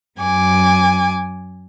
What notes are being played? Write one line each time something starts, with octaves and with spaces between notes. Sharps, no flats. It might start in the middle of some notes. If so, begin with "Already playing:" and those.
F#2 G#5 D6